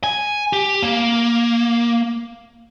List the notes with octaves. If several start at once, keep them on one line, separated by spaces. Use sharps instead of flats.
G#5
G4
A#3